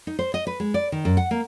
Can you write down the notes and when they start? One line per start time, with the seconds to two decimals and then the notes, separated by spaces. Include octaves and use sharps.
0.07 D#4
0.19 C5
0.34 D#5
0.47 B4
0.60 G#3
0.74 D5
0.92 D#3
1.05 F#2
1.17 F#5
1.31 A#3